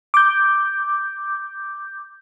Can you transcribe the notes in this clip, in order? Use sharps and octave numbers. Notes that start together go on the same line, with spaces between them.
D6 G6